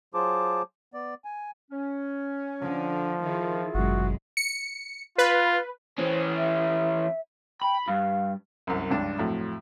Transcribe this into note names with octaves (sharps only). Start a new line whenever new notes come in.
F#3 F4 G#4 C5 A5 D6
B3 D5
G#5
C#4
D3 F3
D#3 E4 F4 G#4
G1 F#2 B2 G#3 F#4
C#7
F4 B4
E3 C#4 C5
E5
G5 B5
G2 F5
C2 F#2
C#2 G2 D4
F2 A2 F#3